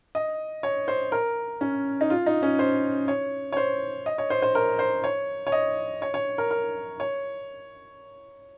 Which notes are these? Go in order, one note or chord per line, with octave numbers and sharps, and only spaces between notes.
D#5
C#5
C5
A#4
C#4
D#4
F4
D#4
C#4
C5
C#5
C#5
C5
D#5
C#5
C5
C5
A#4
C5
C#5
C#5
D#5
C#5
C#5
A#4
A#4
C#5